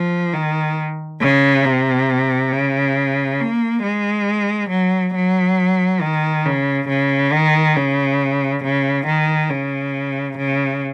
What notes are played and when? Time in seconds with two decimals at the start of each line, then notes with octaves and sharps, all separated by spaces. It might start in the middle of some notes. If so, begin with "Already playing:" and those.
Already playing: F3
0.33 D#3
1.21 C#3
1.65 C3
2.52 C#3
3.40 A#3
3.82 G#3
4.70 F#3
5.14 F#3
6.01 D#3
6.45 C#3
6.88 C#3
7.32 D#3
7.76 C#3
8.64 C#3
9.07 D#3
9.50 C#3
10.37 C#3